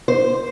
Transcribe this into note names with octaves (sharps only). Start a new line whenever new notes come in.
C5